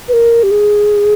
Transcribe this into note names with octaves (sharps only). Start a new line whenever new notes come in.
B4
A#4
G4
G#4